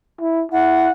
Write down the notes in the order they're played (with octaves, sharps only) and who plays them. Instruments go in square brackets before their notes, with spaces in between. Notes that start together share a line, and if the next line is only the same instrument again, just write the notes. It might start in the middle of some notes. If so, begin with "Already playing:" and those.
[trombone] E4
[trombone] E4 [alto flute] F#5